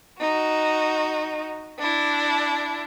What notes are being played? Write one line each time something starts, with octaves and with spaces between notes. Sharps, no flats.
D#4 F#4
D4 E4